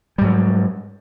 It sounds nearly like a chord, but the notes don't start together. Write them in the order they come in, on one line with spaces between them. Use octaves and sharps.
G3 G#2 F#3